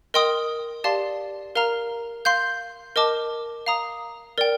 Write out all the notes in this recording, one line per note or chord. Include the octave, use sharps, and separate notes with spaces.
A#4 D#5 G5 C6 D#6
G4 D5 F5 A5 C6
A#4 F5 A#5 F6
F5 C6 G6
A#4 D#5 A5 D6
F5 A#5 D#6
A#4 D5 G5